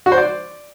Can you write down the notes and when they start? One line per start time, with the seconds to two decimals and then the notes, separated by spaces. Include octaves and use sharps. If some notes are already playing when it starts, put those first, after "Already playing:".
0.06 F#4
0.12 C5
0.18 D5